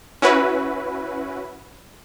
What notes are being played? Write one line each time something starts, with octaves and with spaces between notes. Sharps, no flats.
C#4 E4 F#4 B4